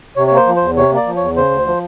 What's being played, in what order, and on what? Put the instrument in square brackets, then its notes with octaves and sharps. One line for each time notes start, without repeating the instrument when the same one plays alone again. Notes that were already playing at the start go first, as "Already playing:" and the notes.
[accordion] C3 C#5
C#5
A#3 C5
F3
C5
E2
C3 C#5
A#3 D5
F3
E2 C#5
C#3 C5
D2
F3